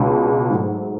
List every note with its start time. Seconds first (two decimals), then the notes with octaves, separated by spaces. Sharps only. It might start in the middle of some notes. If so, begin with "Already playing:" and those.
Already playing: C#2 B2 G#3 D4
0.50 G#2 F#3 A3